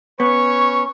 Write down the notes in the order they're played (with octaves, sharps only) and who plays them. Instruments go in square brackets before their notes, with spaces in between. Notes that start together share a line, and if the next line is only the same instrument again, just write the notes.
[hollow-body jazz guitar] B3 [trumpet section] C#4 B4 C#5 [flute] C#6